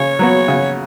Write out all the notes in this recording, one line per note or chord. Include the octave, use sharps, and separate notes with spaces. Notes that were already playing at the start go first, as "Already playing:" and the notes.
Already playing: C#3 C#5
F#3 B3 F#4
C#3